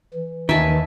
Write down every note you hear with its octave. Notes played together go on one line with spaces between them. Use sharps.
E3
D#2 D#3 E5 G#5 A5